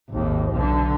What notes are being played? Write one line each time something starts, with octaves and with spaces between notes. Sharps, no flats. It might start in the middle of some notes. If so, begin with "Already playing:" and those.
G#1 D#2
B1 D3